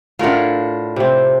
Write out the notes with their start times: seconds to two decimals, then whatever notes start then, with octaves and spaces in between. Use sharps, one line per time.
0.19 A2 D4 F4 A#4 F#5
0.96 C3 C4